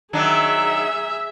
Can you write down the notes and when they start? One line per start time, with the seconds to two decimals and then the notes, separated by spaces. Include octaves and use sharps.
0.13 D#3 F#3 D4 G#4 E5